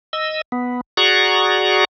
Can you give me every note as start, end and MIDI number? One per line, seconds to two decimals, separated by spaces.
0.13 0.41 75
0.13 0.41 88
0.52 0.81 59
0.97 1.85 66
0.97 1.85 68
0.97 1.85 74
0.97 1.85 78
0.97 1.85 82
0.97 1.85 85